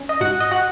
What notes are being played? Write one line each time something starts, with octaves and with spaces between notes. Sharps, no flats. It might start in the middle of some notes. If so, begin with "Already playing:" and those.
Already playing: C#4
D#5
G#2 F#4 F#5
D#5
F#4 F#5